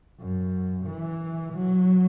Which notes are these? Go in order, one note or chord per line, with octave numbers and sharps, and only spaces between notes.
F#2
E3
F#3